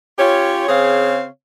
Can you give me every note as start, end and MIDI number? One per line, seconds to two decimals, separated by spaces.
0.19 0.65 61
0.19 0.65 65
0.19 0.65 67
0.19 0.65 73
0.69 1.26 49
0.69 1.26 60
0.69 1.26 68
0.69 1.26 73
0.69 1.26 77